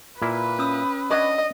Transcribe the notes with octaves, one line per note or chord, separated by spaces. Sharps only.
A#2 A#3 E4 B4
C#4 D#6 E6
D4 C#5 D#5 F#5